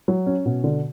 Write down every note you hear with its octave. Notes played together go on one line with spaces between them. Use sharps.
F#3
C#4
B2
D3